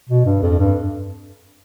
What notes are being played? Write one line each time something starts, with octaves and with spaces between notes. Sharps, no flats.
B2
G2
F2
G2